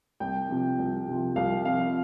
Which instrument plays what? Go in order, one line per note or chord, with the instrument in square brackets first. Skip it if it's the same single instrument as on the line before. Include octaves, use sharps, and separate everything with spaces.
[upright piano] C2 G5
C3 F3
C2
C3 F3
C2 F5
C3 F3 F5